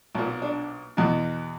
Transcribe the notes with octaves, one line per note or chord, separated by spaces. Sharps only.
B1 A#2
D4
E2 B2